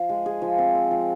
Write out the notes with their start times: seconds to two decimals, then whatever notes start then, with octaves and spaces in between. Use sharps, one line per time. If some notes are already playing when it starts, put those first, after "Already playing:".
Already playing: F3
0.09 G#3
0.26 G#4
0.42 F3
0.58 C4
0.75 C4
0.91 F3